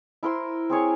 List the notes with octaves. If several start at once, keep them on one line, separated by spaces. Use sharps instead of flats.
E4 A#4 C5 C6
C4 G#4 C#5 G#5